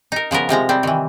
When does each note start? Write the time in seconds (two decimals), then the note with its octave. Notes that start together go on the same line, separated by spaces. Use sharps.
0.12 D#4 A#4
0.31 C#3 F3 B3 A#4
0.49 C3 F3 G#3 A#5
0.69 G3 C4
0.83 D#3 E3